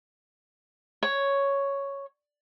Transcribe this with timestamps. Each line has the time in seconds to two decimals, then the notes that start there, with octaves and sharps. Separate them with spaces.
1.03 C#5